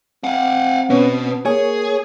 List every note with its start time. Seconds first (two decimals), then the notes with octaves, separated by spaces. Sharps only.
0.24 C4 F5 F#5
0.90 B2 B3 C#4
1.45 A#3 G#4 C#5 G#5 C#6